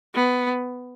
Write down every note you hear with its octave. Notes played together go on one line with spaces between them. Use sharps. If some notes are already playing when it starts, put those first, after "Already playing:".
B3